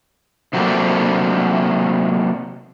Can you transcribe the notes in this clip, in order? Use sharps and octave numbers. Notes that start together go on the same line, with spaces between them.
C3 F#3 A3 A#3 C4 D4